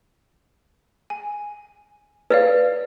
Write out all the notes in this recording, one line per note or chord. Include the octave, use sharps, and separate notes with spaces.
G#5
B4 C#5 D5 F5